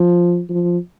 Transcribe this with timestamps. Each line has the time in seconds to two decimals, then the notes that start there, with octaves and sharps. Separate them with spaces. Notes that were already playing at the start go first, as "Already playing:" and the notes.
Already playing: F3
0.50 F3